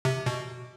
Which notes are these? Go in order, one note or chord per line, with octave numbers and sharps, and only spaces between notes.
C3
B2